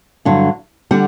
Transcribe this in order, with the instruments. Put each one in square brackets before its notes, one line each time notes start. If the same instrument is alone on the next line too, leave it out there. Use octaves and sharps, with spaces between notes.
[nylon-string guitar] G2 D3 F#3
D3 G3 F#5